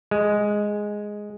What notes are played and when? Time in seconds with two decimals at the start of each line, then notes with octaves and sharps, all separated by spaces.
0.11 G#3